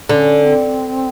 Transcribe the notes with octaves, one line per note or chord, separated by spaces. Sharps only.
D3 C#4 D4
C4